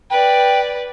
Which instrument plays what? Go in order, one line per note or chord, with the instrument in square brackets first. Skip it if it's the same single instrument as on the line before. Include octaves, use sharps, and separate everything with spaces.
[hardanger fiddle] B4 D5 [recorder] G5